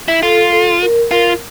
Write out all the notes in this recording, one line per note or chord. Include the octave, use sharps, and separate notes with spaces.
E4
F4 A4
A4
A#4
F4 A#4